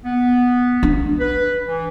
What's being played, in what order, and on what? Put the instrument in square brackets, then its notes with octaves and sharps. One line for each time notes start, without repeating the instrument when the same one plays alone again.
[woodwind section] B3
[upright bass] D4
[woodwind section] B4
E3